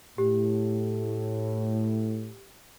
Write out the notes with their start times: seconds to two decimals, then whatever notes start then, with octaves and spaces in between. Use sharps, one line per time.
0.18 A2 G4